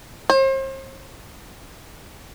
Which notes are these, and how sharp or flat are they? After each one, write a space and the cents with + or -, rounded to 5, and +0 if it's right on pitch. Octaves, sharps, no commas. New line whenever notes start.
C5 +40